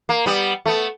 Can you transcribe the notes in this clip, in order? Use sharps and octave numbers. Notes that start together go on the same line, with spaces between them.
A#3
G3 B3
A3 B3